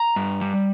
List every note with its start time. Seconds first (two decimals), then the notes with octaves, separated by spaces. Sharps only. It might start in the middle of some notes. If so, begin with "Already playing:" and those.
Already playing: A#5
0.16 G2
0.41 G3